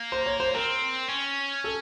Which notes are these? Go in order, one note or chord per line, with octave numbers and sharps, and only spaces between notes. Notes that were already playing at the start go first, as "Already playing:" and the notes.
Already playing: A#3
C5
C#5
C5
C4 A#4
C#4
A4